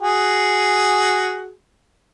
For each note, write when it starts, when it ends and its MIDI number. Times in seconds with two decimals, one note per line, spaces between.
0.01 1.52 66
0.01 1.52 68